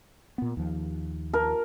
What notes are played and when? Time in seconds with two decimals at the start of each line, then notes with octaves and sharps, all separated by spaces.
0.38 A#2 B3
0.57 D#2 F3
1.34 A#4